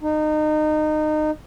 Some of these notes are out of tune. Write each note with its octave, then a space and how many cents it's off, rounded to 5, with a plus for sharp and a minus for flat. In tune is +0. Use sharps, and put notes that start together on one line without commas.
D#4 -25